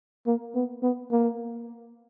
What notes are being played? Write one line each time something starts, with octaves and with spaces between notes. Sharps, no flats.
A#3
B3
B3
A#3